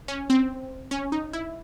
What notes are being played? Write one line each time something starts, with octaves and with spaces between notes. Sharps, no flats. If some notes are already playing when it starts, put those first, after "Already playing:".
C#4
C4
C#4
D#4
E4